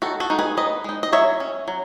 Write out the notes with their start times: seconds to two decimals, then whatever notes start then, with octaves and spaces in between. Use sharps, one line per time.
0.02 D#3 F#4 A4
0.20 F#4 A4
0.30 G#3 D#4
0.39 G#4 B4
0.57 D#3 B4 D#5
0.84 G#3 D#4
1.03 D#5
1.12 F#3 C#5 E5
1.40 C#4
1.68 F#3